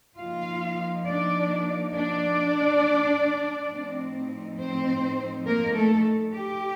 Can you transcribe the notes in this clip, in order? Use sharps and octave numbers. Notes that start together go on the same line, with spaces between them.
F3 A#3 D#4 F4 F5
D4 D5
D4 D5
A2 F3 C4 D#4
C4 C5
A#3 A#4
A3 A4
G4